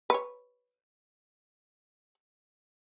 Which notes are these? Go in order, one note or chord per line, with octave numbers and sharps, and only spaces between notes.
B4 C#5